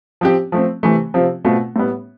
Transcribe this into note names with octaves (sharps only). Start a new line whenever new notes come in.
F3 C4 G4
F3 A3 C4
C3 E3 A3
C3 F3 C4 F4
B2 A3 C4 F4
A2 G3 B3